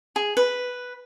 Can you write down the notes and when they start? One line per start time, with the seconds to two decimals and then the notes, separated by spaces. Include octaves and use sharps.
0.16 G#4
0.37 B4